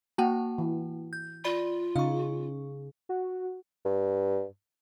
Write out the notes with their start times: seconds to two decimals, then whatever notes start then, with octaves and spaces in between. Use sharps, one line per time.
0.18 A#3 F#4 G5 A5
0.58 E3
1.13 G6
1.44 F4 D5 B5
1.96 C#3 D#4 F5 C#6
3.09 F#4
3.85 G2